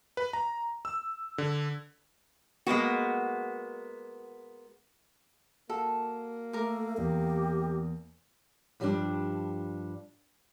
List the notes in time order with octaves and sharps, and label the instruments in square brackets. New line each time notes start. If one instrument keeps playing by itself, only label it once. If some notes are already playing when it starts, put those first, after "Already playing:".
[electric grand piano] B4
A#5
E6
D3
[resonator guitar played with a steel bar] G#3 A#3 B3 F#4
[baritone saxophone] A#3 [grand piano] F#4 [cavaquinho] A4
[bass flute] A3 [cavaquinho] A#4 D6
[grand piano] E2 [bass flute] G4
[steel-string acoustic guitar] G2 F3 G3 C#4 D4